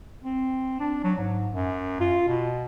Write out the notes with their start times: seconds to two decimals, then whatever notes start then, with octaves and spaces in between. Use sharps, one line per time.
0.24 C4
0.80 D4
1.04 F#3
1.18 G#2
1.52 F#2
2.00 F4
2.28 B2